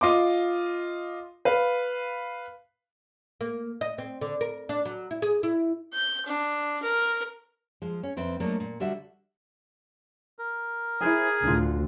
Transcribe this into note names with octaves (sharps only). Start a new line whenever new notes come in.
F4 D#5 C6 D6
B4 F5
A#3
D#5
C4
D3
A#4
D4
F#3
E4
G#4
E4
G6
D4
A#4
F3 G#3
C#4
F2 C4 B4 E5
F#3 A3 A#3 D4 D#5
A#2
D3 G3 F#4 E5
A#4
E4 G#4 C5 G#5
D2 A2 D3 D4 F4